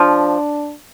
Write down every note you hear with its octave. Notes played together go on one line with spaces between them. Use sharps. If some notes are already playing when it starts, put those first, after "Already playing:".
Already playing: F3 D4